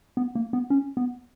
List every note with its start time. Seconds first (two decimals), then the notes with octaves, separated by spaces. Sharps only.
0.17 B3
0.35 A#3
0.53 B3
0.70 C#4
0.97 B3